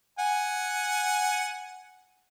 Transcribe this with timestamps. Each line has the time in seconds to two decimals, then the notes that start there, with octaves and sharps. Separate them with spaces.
0.19 F#5 G#5